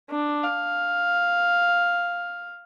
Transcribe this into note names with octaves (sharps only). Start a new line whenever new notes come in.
D4
F5